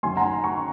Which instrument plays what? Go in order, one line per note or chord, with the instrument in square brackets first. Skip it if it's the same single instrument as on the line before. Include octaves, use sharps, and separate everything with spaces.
[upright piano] F#2 D#3 F#3 G#5 C6
F#5 A#5
A#5 C#6